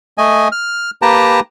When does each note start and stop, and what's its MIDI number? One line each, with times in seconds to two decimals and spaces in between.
0.18 0.48 57
0.18 0.48 75
0.18 0.48 80
0.52 0.90 89
1.02 1.40 58
1.02 1.40 67
1.02 1.40 71
1.02 1.40 79
1.02 1.40 81
1.02 1.40 82